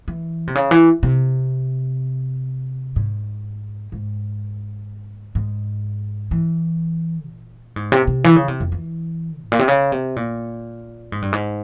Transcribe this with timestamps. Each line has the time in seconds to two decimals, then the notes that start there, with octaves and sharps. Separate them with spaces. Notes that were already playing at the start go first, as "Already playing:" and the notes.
0.08 E3
0.47 C3
0.55 C#3
0.71 E3
1.03 C3
2.96 G#2
3.92 G#2
5.35 G#2
6.31 E3
7.28 A#2
7.76 G#2
7.92 C3
8.07 C3
8.24 E3
8.36 C#3
8.48 C3
8.60 F2
8.72 E3
9.44 G#2
9.52 A#2
9.59 C3
9.68 C#3
9.92 C3
10.16 A#2
11.12 G#2
11.22 G2
11.33 G#2